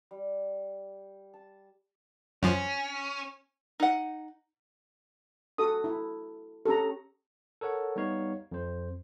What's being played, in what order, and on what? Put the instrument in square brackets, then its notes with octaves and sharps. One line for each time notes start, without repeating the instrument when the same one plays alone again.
[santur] G3
A5
[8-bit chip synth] F#2 F3 [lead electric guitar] C#4
[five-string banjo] D#4 F#5
[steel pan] F#4 A4 D#6
E4
[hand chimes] C#4 G4 [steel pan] A4 A#5
[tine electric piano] A4 A#4 C#5 F#5
G3 B3 D#4 C#5 F5
F2 C5